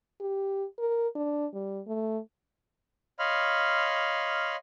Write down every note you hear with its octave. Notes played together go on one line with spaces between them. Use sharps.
G4
A#4
D4
G3
A3
C#5 D#5 F5 B5 C6 F6